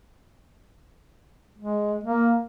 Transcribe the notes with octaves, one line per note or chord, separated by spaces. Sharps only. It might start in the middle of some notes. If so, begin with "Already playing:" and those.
G#3
A#3